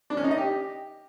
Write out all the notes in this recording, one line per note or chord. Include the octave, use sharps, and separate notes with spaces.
D4
C#4
D#4
D#5
G4